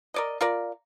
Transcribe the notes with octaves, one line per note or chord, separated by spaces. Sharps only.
A#4 D5 D#5
F4 A#4 D5